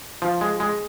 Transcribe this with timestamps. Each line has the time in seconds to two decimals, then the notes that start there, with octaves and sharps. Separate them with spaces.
0.22 F3
0.41 G#3
0.60 G#3